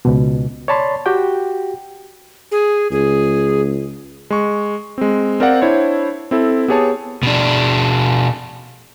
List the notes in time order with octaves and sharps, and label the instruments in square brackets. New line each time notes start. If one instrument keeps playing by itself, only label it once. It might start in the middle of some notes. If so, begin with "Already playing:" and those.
[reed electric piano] C#2 B2
C#5 D5 A5 B5 C6
F#4 G4 G5
[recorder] G#4
[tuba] C#2 [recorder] G#4
[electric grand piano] G#3 C#6
G#3 C4
C4 A#4 C5 D5 F5 F#5
D4 E4 C5 C#5
C4 E4 A4
B3 G4 G#4 C#5 A5
[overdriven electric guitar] B2 D4